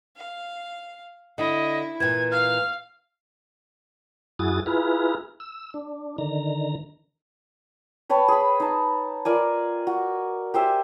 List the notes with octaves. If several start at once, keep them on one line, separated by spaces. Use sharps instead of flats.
F5
D3 E4 D#5
A#2 E3 G#6
F5 F6
F#2 E4 F#4 G#4 D#6 A6
E4 F4 G#4 B4 A#5
E6
D4
D3 D#3 A#5
B4 C#5 G5 A5
G#4 B5
D#4 A5
F4 A#4 D5 G#5
F#4
G4 C5 E5 G#5